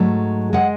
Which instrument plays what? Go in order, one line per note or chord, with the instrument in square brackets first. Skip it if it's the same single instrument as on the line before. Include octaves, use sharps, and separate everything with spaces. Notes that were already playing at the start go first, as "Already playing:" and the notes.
Already playing: [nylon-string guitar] G#2 F#3 A3
C#3 G#3 F#5